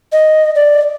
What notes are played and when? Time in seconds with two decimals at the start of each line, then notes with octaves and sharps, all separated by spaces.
0.12 D#5
0.55 D5